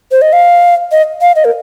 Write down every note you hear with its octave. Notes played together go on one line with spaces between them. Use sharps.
C5
D#5
F5
D#5
F5
D#5
A#4